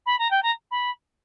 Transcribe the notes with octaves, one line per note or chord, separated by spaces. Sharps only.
B5
A#5
G5
A#5
B5